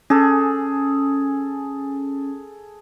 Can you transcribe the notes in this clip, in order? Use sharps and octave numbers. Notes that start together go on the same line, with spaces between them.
C#4 G#4 A4